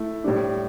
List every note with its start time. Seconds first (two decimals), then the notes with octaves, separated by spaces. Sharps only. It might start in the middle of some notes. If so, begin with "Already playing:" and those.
Already playing: A3 E4
0.24 A2 G3 D4